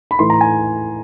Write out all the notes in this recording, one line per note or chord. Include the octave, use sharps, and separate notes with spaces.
B5
A2 E3 C6
A#5
G#5